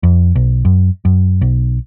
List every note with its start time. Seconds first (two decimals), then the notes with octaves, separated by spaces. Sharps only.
0.03 F2
0.35 B1
0.65 F#2
1.05 F#2
1.41 B1